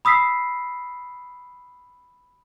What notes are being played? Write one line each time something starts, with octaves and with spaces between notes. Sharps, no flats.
B5 D#6 E6 B6 C7